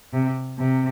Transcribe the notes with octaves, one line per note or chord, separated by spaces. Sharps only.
C3
C3